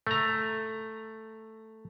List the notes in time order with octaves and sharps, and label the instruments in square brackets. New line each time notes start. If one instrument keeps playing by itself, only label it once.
[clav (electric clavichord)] A3 A#5